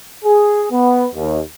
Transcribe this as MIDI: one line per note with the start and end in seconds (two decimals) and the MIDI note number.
0.24 0.65 68
0.71 1.07 59
1.14 1.40 39